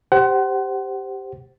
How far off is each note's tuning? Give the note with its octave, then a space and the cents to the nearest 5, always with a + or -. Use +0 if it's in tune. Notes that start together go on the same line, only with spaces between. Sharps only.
G4 +0 C5 +0 F#5 +30